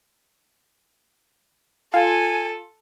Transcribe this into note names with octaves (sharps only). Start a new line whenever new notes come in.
F4 A4 G#5